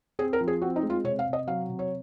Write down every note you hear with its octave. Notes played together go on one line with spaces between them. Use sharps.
C4 G#4
A#4
F3
G#4
C4 F#4
D#4
G#3
F4
C3 C#5
F5
C3
D#5
F#3 F5
C3
C#5